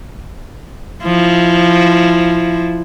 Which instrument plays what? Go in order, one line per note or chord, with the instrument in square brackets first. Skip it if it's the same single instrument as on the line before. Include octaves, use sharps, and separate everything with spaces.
[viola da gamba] F3 E4